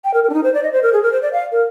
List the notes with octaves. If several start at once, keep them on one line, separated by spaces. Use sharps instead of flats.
G5
A#4
A#4
D4
D#4
C5
D5
D#5
C5
A#4
G#4
A#4
C5
D5
F5
A#4